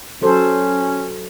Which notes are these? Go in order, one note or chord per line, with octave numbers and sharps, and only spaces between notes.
F#3 C#4 A4 C5